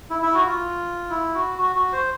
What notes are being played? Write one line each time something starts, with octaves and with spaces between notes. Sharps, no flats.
E4
E4
F#4
F4
E4
F#4
F#4
F#4
C5